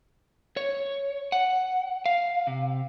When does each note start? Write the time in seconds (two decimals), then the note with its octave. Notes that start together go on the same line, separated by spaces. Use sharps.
0.57 C#5
1.32 F#5
2.06 F5
2.47 C3